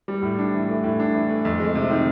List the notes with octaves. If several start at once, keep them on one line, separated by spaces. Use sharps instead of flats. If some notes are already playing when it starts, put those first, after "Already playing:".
G3
A2
D4
E3
A3
A2
D4
E3
A3
F2
G#3
C3
D#3